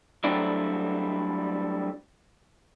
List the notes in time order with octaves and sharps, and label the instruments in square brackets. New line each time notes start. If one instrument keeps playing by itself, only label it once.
[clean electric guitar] F#3 G3 A3 C4 D4 E4